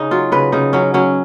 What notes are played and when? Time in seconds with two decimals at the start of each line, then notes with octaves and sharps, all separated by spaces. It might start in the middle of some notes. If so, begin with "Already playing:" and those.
Already playing: C#3 C#4 D#4
0.11 F#3 F4
0.32 C#3 B4
0.52 C#3 D#4
0.73 F#3 C#4
0.94 F#3 C#4